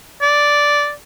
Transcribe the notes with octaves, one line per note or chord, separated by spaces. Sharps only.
D5